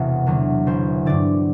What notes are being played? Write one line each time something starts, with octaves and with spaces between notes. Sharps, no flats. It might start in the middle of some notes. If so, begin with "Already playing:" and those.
Already playing: E1 E2 C3 F#5
E2 D3 F#3 B3
A1 C5
G2 D3 D5